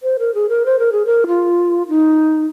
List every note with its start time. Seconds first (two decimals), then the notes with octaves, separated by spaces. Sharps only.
0.03 C5
0.19 A#4
0.35 G#4
0.50 A#4
0.66 C5
0.79 A#4
0.92 G#4
1.06 A#4
1.27 F4
1.89 D#4